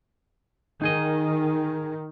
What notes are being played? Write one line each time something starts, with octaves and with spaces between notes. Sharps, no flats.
D#3 D#4 G#4 D#5